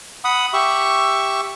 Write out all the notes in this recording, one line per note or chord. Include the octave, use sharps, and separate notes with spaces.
F#5 B5 D#6
G4 E5 C#6